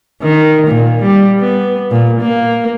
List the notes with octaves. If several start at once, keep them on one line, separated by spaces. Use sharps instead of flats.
D#3
A#2
G3
B3
A#2
A#3